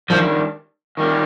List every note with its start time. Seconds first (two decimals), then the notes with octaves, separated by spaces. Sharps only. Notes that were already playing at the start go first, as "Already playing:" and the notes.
0.10 D#3 F3 G3 D4
0.97 D#3 G3 A#3